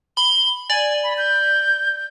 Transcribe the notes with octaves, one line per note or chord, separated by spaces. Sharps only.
B5 G7
D5 G#5
B5
G6